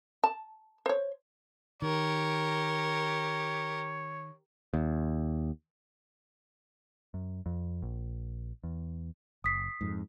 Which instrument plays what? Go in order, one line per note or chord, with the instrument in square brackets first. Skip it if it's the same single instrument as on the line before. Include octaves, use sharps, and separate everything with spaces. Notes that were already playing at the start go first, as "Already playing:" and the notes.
[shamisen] A5
C5 C#5
[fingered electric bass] D#3 [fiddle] G4 A#4 [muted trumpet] C#5
[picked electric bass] D#2
F#2
F2
A#1
E2
[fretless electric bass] F#1 [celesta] D#6 B6 C7
[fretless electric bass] F2 G#2